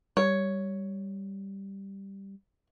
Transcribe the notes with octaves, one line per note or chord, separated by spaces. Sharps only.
G3 C#5